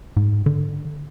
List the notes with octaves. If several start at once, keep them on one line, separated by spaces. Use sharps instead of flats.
G#2
D3